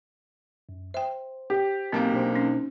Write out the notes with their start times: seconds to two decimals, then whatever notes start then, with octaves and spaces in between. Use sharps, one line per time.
0.69 F#2
0.94 C5 E5 G5
1.50 G4
1.92 B1 A#3 C4 F5
2.13 B2 D4 C5
2.35 C#4 D#4